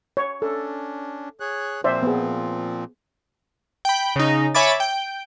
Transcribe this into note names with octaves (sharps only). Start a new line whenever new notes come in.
C#5
C#4 D4 A4
G#4 C#5 F#6
A#2 F3 C4 C5 D5 E5
B3 G#4
G5 B5
C#3 D#4
C#5 E5 G#5 B5 D6 A6
G5